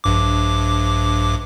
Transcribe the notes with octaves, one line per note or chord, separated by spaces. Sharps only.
A#1 G2 D6